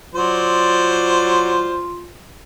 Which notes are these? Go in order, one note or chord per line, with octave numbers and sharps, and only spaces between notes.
F#3 F4 C5 D5